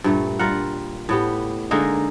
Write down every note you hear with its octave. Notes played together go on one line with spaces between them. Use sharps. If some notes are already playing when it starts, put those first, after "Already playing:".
G2 A#2 A3
G3 F4 A#4 F#5
A2 B3 G4
D3 G#3 A#3 D#4